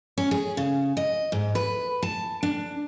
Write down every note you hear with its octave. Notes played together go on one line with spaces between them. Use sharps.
C#4
G#4
C#3
D#5
G#2
B4
A5
D4